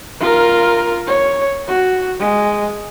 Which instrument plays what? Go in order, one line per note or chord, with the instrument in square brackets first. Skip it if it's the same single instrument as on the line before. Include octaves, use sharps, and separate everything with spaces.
[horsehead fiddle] F4 A#4
C#5
F#4
G#3